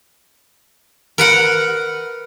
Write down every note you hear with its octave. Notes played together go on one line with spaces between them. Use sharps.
A#4 B4 F#5